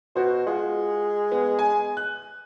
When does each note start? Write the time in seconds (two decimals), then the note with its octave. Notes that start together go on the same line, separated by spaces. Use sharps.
0.16 B2 F#4 C5
0.46 G#3 F4 F#5
1.32 B3
1.59 G#5
1.97 F#6